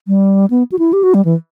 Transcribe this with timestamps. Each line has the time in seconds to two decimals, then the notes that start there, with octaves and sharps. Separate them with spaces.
0.07 G3
0.50 B3
0.72 F#4
0.79 E4
0.93 G4
1.03 F#4
1.14 G3
1.25 E3